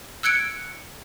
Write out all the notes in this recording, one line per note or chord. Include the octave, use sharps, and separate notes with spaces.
E6 F#6 G#6 C#7 D7